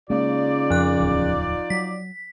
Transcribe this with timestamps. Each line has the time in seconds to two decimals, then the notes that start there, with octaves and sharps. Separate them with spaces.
0.10 C#3 G#3 A#3 D#4 F4 D5
0.70 F2 F3 F#6
1.00 D1 E2
1.70 F#3 B6